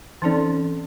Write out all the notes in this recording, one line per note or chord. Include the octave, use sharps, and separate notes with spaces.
E3 C4 C#4 D#4 A4 D5